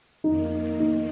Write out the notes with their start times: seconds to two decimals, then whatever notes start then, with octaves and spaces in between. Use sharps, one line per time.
0.24 F2 D#3 A#3 D#4
0.80 D#4